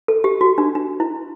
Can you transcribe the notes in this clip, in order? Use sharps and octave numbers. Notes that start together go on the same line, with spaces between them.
A4
G4
F#4
D4
D4
E4